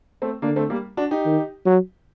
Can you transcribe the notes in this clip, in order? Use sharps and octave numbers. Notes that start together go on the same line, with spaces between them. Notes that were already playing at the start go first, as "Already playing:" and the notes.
A3 C4
D3 A#3 D4
A3 C4
G3 A#3
D4 F#4
D#4 G4
D#3
F#3